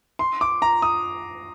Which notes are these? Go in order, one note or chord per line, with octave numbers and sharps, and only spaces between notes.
C6
D6
A#5
D#6